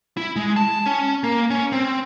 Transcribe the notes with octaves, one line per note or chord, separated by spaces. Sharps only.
E4
G#3
A5
C#4
A#3
C#4
C4